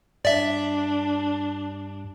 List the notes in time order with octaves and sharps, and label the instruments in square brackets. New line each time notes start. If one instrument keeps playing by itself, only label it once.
[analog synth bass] G2 [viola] D4 [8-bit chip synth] D5 E5